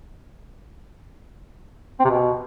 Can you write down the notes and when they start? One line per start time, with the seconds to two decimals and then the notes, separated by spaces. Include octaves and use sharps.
1.99 C4
2.05 C3
2.10 B2